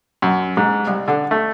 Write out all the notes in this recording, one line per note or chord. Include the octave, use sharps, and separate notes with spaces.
F#2
G#2
C2
D3
A3